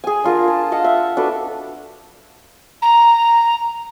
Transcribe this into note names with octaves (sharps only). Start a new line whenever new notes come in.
G#4 G#5
D4 F4 A#4 F#5
A5
D#5 F5 F#5 A5
E5
D4 F#4 A4 B4
A#5